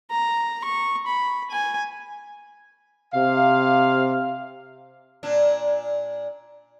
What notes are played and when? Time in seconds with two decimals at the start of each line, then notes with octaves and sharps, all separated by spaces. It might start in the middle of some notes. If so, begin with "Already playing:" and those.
0.11 A#5
0.65 C#6
1.07 B5
1.51 G#5
3.14 C3 F5
5.23 A#2 D4